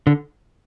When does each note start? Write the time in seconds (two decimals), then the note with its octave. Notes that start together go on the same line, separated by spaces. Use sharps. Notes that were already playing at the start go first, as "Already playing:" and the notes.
0.07 D3